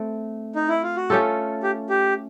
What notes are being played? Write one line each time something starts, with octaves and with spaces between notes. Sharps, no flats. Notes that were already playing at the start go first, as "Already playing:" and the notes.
Already playing: A3 C4
D#4
E4
F4
F#4
A3 C#4 F4 G4 A4
G4
G4